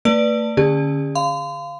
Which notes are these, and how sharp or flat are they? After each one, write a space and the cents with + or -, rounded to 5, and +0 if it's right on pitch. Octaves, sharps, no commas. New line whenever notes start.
A3 +40 B4 -10 D5 +0
D3 +5 C#4 +0 G#4 -40
F5 -10 C6 -40